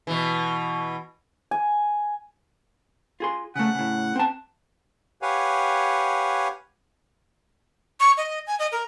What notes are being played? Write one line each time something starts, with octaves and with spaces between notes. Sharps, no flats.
B2 E3
G#5
F4 G#4 C6
C#3 A3 F#5
A2 C#3
C4 A5
G4 B4 C#5 F5 F#5 G#5
C#6
D#5
G#5
D#5
A#4